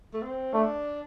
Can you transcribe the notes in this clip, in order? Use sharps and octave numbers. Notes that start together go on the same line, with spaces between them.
A3
C4
A3 D4